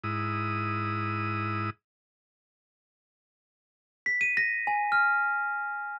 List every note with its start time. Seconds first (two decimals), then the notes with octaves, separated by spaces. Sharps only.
0.04 G#2 E4 D#6
4.06 B6
4.21 D#7
4.37 A#6
4.67 G#5
4.92 F6